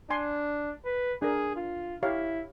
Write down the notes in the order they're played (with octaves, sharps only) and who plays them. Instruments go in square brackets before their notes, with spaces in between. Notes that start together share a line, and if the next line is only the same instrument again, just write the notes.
[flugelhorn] D4 [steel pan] G#5 C6
[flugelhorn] B4
[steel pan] D4 A#4 [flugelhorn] G#4
[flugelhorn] F4
[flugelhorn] E4 [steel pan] G4 C#5 F5